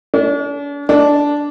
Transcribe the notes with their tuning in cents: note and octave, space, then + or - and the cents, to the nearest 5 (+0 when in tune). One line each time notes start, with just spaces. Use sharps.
D4 -45
D4 -10